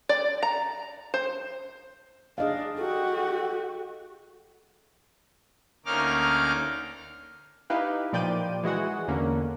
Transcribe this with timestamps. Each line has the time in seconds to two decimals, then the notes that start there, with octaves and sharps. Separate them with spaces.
0.09 D5
0.43 A#5
1.14 C5
2.38 D4 G#4 D#5 F5
2.77 F#4 G4 A4
5.85 D2 A#3 C#4 D#4 D6 F6
7.70 D#4 E4 G4 B4 F5
8.13 A#2 F3 D5 G5 G6 D#7
8.63 E3 G#3 F#4 F#5
9.08 E2 D3 A#3 C#4